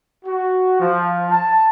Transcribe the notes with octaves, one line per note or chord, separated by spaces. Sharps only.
F#4
F3
A5